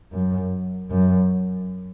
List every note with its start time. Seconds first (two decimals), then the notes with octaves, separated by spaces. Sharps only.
0.13 F#2
0.90 F#2